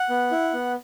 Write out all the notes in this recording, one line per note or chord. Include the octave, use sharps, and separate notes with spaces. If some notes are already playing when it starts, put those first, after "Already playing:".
Already playing: F#5
B3
E4
B3